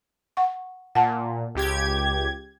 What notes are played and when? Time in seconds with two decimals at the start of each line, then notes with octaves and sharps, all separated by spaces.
0.37 F#5 C#6
0.95 A#2 F#5 A5
1.55 C#2 G4 G#6